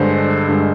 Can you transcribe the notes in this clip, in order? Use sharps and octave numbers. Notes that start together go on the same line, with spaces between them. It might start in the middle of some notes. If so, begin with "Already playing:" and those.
Already playing: G2 D3 G#3 C5
G2 D3 G#3